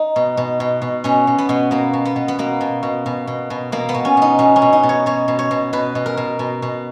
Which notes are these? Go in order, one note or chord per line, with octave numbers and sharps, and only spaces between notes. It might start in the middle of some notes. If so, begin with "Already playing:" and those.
Already playing: D#4
B2
B2
B2
B2
B2 C#4
B2
B3
B2
B2 A#3
B2
B3
B2
B3
B2 A#3
B2
B2
B2
B2
B2
B2 A#3
B3
B2
C#4
B2 D#4
B2 C#4
C#4
B2
D#4
B2
C#5
B2 C#5
B2
C#5
B2
B2 B4
B2
A#4
B2
B2
B2